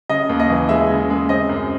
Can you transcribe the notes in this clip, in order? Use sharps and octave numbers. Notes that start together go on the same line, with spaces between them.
C#3 D#5
D#2
D#5
E3
G#3 E5
C#3
G#3
C4 D#5
F#2